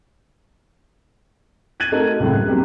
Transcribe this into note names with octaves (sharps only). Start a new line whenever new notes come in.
F#6 G#6 A6 D#7 F#7
A3 C4 D#4 F#4 A4 A#4
C#2 F#2 A2 C3
F#6
B2 F#3 A#3 C4 D4 G4